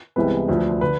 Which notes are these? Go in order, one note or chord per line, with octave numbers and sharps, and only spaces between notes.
C2 C3 E3 G#3 B3 B4
D2 D3 F3
D3 B4